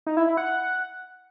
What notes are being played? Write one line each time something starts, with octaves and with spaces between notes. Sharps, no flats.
D#4
E4
E4
F#5